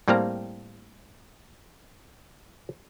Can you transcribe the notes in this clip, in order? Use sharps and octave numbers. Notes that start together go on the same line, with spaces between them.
A2 G3 A#3 C4 F5 A#5